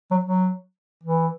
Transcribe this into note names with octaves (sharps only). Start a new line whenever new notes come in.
F#3
F#3
E3